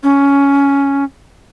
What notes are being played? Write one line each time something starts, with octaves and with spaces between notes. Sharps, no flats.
C#4